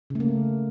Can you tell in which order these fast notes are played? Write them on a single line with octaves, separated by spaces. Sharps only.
C#3 A3 A#3